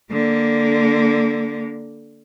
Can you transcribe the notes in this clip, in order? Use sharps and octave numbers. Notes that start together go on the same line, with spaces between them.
D3 A#3